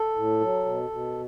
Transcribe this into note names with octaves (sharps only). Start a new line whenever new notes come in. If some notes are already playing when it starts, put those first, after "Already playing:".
Already playing: A4
A2
F#3
B2
B2